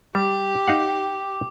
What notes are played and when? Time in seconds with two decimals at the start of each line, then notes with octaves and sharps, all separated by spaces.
0.15 G3 G4 D6
0.68 D#4 F5 F#5